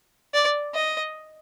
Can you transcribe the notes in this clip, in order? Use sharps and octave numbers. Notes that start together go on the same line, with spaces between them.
D5
D#5